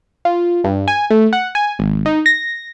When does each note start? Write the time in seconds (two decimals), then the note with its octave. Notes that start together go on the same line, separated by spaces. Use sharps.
0.25 F4
0.64 G2
0.88 G#5
1.10 A3
1.33 F#5
1.55 G#5
1.79 G#1
2.06 D#4
2.26 A#6